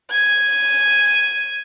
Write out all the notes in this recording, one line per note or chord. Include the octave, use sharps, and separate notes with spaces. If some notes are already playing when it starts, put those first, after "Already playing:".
G#6 D#7